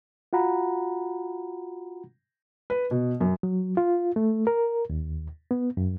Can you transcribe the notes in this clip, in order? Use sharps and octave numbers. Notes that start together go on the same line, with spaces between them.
F4 F#4 F#5 A#5 B5
B4
B2
F#2
F#3
F4
A3
A#4
D#2
B3
F#2